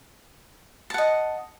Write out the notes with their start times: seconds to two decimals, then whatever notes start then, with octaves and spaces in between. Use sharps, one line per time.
0.90 A5
0.94 F#5
0.98 D#5